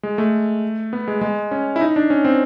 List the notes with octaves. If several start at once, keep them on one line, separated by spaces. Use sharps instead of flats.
G#3
A3
B3
G#3
G#3
C#4
E4
D#4
D4
C#4
C4